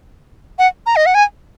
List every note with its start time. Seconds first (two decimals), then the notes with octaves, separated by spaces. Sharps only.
0.59 F#5
0.86 A#5
0.96 D#5
1.06 F#5
1.15 G#5